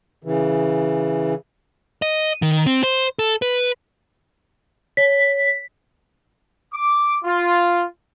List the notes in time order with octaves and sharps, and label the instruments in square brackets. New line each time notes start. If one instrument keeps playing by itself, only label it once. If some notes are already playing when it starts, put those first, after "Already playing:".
[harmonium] C#3 E3
[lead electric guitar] D#5
D#3
C4
C5
A4
B4
[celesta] C#5 [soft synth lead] B6
[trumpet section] D6
F4